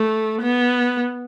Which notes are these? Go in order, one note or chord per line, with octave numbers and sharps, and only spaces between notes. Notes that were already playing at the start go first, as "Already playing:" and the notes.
Already playing: A3
B3